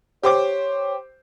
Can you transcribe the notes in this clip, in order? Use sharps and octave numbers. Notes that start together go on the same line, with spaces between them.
G4 C5 C#5 D6